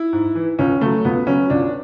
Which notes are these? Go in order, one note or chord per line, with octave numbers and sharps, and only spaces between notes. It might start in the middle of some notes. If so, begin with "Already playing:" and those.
Already playing: E4
G#2
E3
C#2 C#4
C#3 F#3 A3
C#2 B3
C#3 F#3 C#4
C#2 D4